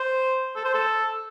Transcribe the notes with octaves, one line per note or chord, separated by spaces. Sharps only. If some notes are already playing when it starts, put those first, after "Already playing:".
Already playing: C5
A4
C5
A4